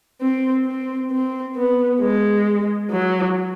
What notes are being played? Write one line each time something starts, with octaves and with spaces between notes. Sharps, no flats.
C4
C4
C4
B3
G#3
F#3